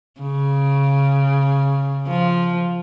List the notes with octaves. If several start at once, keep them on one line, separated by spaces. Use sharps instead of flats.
C#3
F3